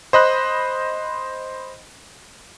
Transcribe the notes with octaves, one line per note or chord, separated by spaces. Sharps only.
C5 D#5 B5 F#6